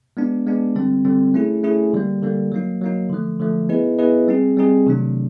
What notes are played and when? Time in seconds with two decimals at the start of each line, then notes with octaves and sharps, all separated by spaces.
0.17 G#3 B3 D4
0.47 G#3 B3 D4
0.75 D3 G3 C4
1.05 D3 G3 C4
1.34 A3 C#4 E4 G#4
1.63 A3 C#4 E4 G#4
1.93 D3 G3 A#3
2.23 D3 G3 A#3
2.52 F#3 A#3 D#4
2.81 F#3 A#3 D#4
3.10 D3 F3 A3
3.40 D3 F3 A3
3.69 B3 E4 G#4 B4 D#5
3.99 B3 E4 G#4 B4 D#5
4.28 G3 C4 D#4 G#4
4.57 G3 C4 D#4 G#4
4.87 C3 D#3 F#3 A3 D4